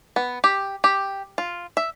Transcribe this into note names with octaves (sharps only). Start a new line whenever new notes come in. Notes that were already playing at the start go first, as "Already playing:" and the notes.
B3
G4
G4
F4
E5